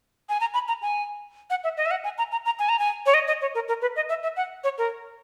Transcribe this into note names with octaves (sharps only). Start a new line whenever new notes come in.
G#5
A#5
B5
A#5
G#5
F#5
E5
D#5
E5
F#5
G#5
A#5
A#5
A#5
G#5
A#5
G#5
C#5
D#5
D#5
C#5
A#4
A#4
B4
D#5
E5
E5
F#5
C#5
A#4